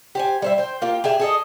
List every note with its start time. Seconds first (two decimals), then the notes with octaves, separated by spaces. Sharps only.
0.15 G4 C5 G#5
0.42 G3 C5 E5
0.58 C5 G5
0.82 A#3 F4 G4
1.04 G4 G#4 E5 G#5
1.20 G#4 A4 D#5